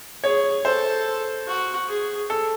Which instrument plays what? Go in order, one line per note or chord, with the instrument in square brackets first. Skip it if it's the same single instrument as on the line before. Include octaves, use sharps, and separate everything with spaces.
[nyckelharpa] G#4 [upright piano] C#5
[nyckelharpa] A4 [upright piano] C5
[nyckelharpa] F#4
G#4
[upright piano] A4